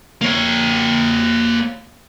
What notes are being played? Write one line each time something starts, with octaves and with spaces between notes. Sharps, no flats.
A#3 C#5